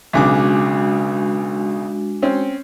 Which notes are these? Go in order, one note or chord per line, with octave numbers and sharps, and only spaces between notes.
B1 C#3 G#3 D4 F#4 D6
C4 C#4